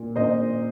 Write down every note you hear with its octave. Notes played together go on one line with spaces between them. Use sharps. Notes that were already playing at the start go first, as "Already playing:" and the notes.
Already playing: A#2
A#2 C5 D#5